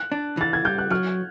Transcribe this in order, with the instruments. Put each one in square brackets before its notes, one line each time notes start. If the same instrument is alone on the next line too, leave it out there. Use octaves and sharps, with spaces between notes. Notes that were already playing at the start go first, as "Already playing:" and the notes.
Already playing: [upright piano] F#6
[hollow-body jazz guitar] D4
[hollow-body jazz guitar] E3 [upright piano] A6
[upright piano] G#6
[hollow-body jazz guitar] G3 [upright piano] G6
[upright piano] F#6
[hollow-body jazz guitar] F#3 [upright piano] F6